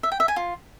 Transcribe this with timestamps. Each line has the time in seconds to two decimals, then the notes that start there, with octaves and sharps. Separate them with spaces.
0.03 E5
0.12 G5
0.20 E5
0.28 G#5
0.36 F4